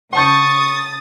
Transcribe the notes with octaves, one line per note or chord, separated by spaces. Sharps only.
C#3 F#5 A5 C#6 D#6 G6 A6